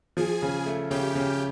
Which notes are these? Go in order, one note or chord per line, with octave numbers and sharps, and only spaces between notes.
F3 G#4 G#5
C#3
A3
C#3 G4 G5
C#3